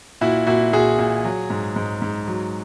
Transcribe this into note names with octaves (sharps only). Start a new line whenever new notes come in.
A#2 E4 F#4
A#2 E4 F#4
A#2 F#4 G#4
A#2
F#3
G#2
G#2
G#2
F#3